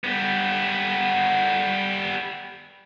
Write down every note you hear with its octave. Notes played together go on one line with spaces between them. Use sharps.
G3 B3